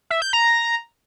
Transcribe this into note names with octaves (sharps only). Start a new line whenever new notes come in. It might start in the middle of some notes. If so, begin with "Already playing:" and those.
E5
G6
A#5